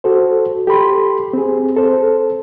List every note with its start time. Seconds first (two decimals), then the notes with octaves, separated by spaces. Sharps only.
0.04 F#4 A4 C5
0.67 G4 A4 B5 C6
1.33 C4 G#4
1.76 A4 C5